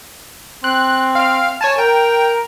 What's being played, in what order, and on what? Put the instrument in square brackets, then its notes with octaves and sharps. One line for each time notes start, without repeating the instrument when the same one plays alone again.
[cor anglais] C4 [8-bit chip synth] F#6
[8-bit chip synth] F5 F6
C#5 G#5 A5
[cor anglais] A#4 [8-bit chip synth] G5